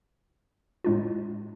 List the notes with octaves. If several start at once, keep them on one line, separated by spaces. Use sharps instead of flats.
A2 G#3 D4 F4